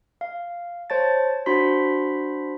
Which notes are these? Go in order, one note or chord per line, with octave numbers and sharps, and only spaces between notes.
F5
C5 C#5 A5 A6
D4 F#4 C5 B5 C6 B6